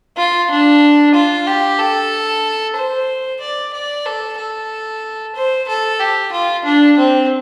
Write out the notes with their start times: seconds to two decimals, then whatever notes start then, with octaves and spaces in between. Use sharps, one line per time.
0.17 F4
0.50 D4
1.15 F4
1.47 G4
1.79 A4
2.77 C5
3.41 D5
3.74 D5
4.06 A4
4.38 A4
5.35 C5
5.68 A4
6.00 G4
6.32 F4
6.65 D4
6.98 C4